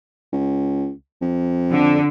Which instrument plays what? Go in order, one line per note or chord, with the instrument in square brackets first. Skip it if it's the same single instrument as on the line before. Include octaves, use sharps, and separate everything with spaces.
[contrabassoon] C#2
F2
[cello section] D3